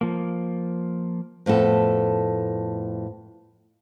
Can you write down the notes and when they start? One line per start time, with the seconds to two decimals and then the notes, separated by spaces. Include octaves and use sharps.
0.01 F3 A#3
1.46 F2 A2 B3 A4